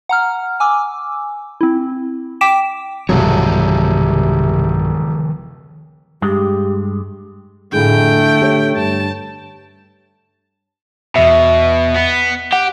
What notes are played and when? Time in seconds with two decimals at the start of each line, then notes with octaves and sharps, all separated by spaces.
0.09 F#5 A#5 F6
0.60 G#5 D6 E6
1.61 C4 E4
2.41 G5 D6 B6 D7 E7
3.09 E1 B1 G2 C3 D#3 F3 F#3 C#5
6.22 G2 G#3 G4
7.73 F2 A2 D3 A3 G#4 G5
8.42 G4 C#5
8.77 G2 A5
11.16 E2 B2 E5
11.95 B3
12.53 G4 F#5